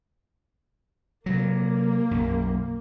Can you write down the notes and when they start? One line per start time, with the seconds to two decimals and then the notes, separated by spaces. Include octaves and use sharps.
1.26 C3 F#3 A#3
2.11 B1 F#2